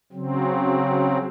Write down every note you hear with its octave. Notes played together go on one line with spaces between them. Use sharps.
C#3 F#3 C4